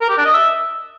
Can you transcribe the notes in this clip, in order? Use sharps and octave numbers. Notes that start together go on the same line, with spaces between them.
A#4
G4
D4
D#5
E5